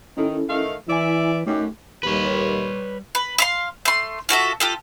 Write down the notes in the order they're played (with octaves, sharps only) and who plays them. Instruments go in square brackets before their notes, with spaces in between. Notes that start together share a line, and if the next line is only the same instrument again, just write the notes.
[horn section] D#3 [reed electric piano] C#4 E4 A4
[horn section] D#3 A3 F5
[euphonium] E3 [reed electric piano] E4 G#5 [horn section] D5 E5
[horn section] F#2 G4 [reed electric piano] A3 [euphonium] D#4
[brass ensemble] D#2 [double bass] G3 [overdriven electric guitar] B4 C#5
[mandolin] B4
E5 F5 C6
A3 C6
F4 F#4 A4 E5
F4 G4 A4